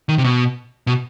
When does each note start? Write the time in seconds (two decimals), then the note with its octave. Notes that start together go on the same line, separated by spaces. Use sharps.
0.09 D#3
0.18 C3
0.24 B2
0.87 B2